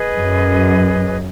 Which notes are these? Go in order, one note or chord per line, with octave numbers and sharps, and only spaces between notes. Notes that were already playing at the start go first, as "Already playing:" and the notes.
Already playing: G#4 B4 D#5
F#2